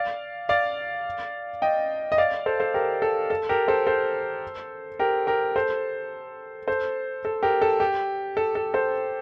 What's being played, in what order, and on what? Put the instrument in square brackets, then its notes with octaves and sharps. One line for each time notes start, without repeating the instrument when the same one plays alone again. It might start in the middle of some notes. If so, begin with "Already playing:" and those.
Already playing: [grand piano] D5 F5
D5 F5
D#5 G5
D#5
D5 F5
A4 C5
A4 C5
G4 A#4
A4
A4
G4 A#4
A4 C5
A4 C5
G4 A#4
G4 A#4
A4 C5
A4 C5
A4
G4 A#4
A4
G4
A4
A4
A4 C5